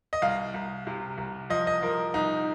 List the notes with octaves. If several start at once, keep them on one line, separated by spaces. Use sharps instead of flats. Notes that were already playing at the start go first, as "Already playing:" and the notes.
D#5
C2 F5
C2
C3
C2
F3 D#5
D#5
F3 A#4
C2 D#4